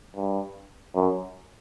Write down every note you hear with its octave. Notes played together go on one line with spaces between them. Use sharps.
G2
F#2